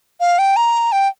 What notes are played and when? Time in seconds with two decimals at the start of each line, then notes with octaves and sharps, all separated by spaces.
0.20 F5
0.39 G5
0.56 A#5
0.92 G5